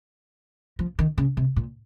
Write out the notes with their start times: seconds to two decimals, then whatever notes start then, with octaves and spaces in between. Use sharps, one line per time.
0.79 F3
0.99 D#3
1.18 C#3
1.37 C3
1.56 A#2